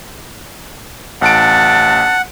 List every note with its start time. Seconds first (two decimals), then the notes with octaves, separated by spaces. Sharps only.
1.22 A1 F#5 A5 D7